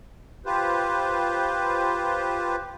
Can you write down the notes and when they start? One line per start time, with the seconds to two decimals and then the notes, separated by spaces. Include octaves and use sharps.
0.46 F4 G4 B4 C5